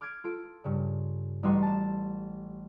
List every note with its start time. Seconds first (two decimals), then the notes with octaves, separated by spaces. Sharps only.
0.01 D6 F6 G6 G#6 D7
0.24 F4 A4 D7
0.64 G2 C#3
1.43 A1 G3 D#4 F#4 C6
1.62 A5 E7